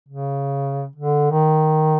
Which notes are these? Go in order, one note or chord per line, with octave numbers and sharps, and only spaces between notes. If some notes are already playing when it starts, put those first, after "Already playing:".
C#3
D3
D#3